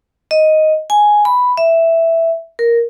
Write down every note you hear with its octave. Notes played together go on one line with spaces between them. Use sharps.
D#5
G#5
B5
E5
A#4